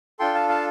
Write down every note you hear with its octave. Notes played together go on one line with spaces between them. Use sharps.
D4 F4 A4 G5 C6
F5 A5
F5 A5